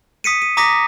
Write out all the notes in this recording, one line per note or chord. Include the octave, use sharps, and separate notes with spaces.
D#6 B6 C#7 D#7
D#7
A#5 D6 D#6 A#6 B6